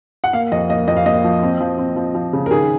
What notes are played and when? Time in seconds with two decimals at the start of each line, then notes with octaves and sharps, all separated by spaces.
0.24 F#5
0.33 A#3 F5
0.52 F2 D#5
0.69 A#3 D#5
0.87 F2 D#5
0.97 F5
1.06 A#3 D#5
1.24 F3
1.43 C4
1.60 F3
1.78 C4
1.96 F3
2.15 F3
2.33 C#3
2.46 A#4
2.51 D#3 G#4